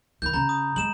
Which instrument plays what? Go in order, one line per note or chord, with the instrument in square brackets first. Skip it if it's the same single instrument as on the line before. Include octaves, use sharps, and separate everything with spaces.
[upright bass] D#3 [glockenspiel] B5 G6
[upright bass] C#3 [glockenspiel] A#5
[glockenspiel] D#6
[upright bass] G#3 [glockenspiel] E7 F#7